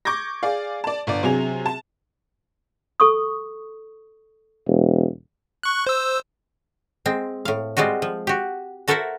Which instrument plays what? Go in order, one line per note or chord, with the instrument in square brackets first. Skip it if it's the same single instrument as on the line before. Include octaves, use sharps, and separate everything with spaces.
[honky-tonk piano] C#6 D6 G6 G#6 A#6
G#4 D5 F5
D5 A5
G1 D5
C3 F#3 G#4 F7
A5
[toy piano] A4 C#6 D#6
[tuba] E1
[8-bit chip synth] C#6 F#6
C5 E6
[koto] G#3 C4
A2 F5
G3 G#3 C4 F4 F#4
F3
F#4 G4
F#4 A4 A#4 C5 E5 F#5